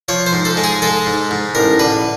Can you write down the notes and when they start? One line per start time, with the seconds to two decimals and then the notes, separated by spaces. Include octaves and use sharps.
0.08 F3 C#5
0.26 C5
0.33 G#2
0.45 A4
0.57 G#3
0.64 G#4
0.82 G#3 A4
1.06 G#2
1.31 G#2
1.55 A1 A#4
1.79 D3 B4